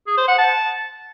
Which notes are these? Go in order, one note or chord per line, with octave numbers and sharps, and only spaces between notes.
G#4
C5
F#5
A5